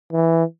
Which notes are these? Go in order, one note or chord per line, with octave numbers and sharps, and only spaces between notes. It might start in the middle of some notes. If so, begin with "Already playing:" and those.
E3